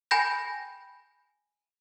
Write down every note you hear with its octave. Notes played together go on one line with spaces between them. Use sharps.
G5 G#5 B5 G6 A#6